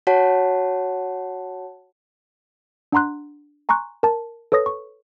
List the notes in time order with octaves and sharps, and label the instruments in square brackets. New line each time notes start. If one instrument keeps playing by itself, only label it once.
[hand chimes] F#4 C#5 F#5 A5
[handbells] D4 F#5 A#5 C6 F#6
G#5 A#5 C6 C#6 F#6
A#4 A5
A4 B4 C#5 D#6 A#6
C#6